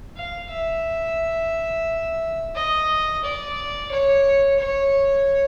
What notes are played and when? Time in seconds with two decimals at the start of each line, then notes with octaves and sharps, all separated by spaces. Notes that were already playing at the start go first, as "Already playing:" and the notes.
0.17 F5
0.51 E5
2.55 D#5
3.24 D5
3.91 C#5
4.60 C#5